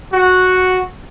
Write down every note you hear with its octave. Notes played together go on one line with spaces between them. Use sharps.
F#4 F#5